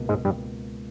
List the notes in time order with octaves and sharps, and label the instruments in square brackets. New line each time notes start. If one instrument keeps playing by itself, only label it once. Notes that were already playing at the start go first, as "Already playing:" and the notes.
Already playing: [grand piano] C#2 B2 A#3
[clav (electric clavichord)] G#2 G#3
G2 G3